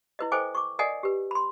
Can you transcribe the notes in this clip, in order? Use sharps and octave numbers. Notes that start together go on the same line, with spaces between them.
E4 B4 D#5
A4 C5 D#5 G5 G#5 D6
C#6 D6
A#4 D5 D#5 F#5 G#5
G4 B4
B5 C6